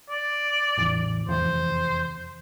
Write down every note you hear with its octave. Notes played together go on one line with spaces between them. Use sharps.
D5
A1 E2
F1 E2 C5